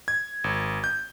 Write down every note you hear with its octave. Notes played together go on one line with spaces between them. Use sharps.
G#6
G#1
G6